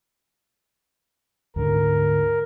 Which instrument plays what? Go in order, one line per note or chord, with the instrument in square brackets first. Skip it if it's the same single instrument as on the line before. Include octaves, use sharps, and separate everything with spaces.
[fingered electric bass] D2 G#2 D3 [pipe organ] A#4